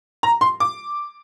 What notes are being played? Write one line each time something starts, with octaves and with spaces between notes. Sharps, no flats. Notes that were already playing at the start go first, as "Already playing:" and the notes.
A#5
C6
D6